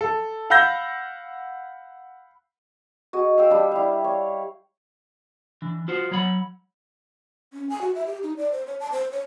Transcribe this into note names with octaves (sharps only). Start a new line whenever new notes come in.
A4
F5 F#5 B5 E6 G6 A#6
F#4 G#4 D#5
F5 G5 E6
G3 D4
E4 F5
C#5
E3 D4
F4 F#4 C5
F#3 C#5 F#5 B5
C#4
G#5
F#4
E5
G4
D#4
D5
C5
C#5
A5
C5
C#5